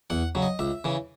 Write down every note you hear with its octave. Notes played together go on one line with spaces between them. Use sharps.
E2 F#5
C#3 F#3
D#5
C#2 E5
C#3 E3